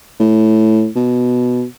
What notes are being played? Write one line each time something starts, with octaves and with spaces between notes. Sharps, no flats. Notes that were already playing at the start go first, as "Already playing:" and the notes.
A2
B2